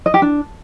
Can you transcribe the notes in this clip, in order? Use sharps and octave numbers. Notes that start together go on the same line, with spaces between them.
D#5
G4
D4